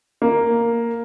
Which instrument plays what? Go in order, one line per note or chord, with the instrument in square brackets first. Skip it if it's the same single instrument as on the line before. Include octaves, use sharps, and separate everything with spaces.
[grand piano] A#3